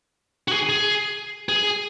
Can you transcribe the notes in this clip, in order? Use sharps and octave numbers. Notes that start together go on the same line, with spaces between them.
F#4
G#4
G#4
G#4